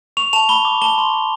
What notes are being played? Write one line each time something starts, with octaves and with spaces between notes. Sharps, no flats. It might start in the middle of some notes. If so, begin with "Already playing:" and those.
C#6 F7
A5 F7
B5 G7
D6
A5 G7
C6
C6